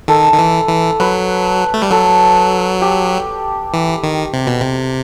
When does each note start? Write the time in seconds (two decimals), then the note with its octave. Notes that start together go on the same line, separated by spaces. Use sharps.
0.08 D#3 A4
0.33 D#3
0.39 E3
0.69 E3
1.00 F#3 B4
1.74 A3
1.82 G3
1.91 F#3 A4
2.82 G4
3.74 E3
4.03 D#3
4.33 C3
4.47 B2
4.61 C3